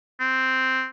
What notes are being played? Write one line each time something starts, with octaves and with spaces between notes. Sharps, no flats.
C4